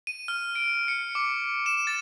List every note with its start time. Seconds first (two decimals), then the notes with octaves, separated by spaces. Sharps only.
0.07 D#7
0.28 F6
0.55 D7
0.88 C#7
1.15 D6
1.66 E7
1.87 A6